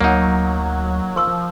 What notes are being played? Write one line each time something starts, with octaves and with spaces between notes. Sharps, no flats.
D2 F#3 A#3 D#4 C#5 F#5
F3 A#4 C#6 E6